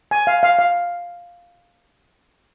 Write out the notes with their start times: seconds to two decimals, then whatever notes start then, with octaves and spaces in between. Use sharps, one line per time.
0.11 G#5
0.27 F5
0.43 F5
0.59 F5